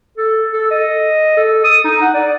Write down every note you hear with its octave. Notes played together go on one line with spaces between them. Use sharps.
A4
A4
D#5
A4
D#6
D#4
F#5
D5